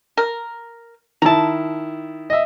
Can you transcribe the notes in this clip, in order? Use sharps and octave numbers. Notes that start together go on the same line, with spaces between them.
A#4
D#3 E4 A5 A#5
D#5 E5